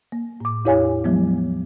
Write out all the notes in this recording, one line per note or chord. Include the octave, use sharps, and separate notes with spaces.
A#3
A2 D6
E2 E4 G4 C#5 F5 G#5
F3 F#3 G#3 B3